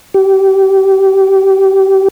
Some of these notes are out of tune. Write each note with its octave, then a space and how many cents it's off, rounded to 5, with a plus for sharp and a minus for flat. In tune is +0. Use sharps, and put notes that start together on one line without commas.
G4 -25